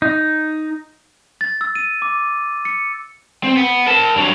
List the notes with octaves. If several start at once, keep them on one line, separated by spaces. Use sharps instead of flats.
D#4
A6
E6
D#7
D6
C#7
C4
B3
A#4 A5
G2 F#3